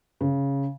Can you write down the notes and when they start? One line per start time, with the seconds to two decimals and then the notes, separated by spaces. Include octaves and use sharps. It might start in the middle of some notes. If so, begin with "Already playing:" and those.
0.21 C#3